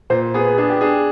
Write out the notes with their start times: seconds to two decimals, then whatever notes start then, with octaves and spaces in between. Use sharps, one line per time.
0.10 A#2 C5
0.34 B3 G#4
0.58 D4 G#4
0.70 G4
0.81 D4 G#4